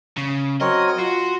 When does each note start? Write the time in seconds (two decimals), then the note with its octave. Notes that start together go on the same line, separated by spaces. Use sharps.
0.18 C#3
0.61 F#3 C4 A#4 C#5 D#5
0.98 F4 F#4 C6